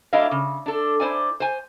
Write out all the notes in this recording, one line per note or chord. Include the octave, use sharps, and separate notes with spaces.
F#3 A3 D4 E4 D#5 F5
C#3
D4 A4
E4 C5 D5 G#5
C5 G#5